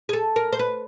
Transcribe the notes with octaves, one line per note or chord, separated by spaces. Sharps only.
G#4
A4
A#4
C5
B4